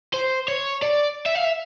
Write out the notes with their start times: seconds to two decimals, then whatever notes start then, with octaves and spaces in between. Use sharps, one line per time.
0.14 C5
0.48 C#5
0.83 D5
1.26 E5
1.35 F5
1.44 E5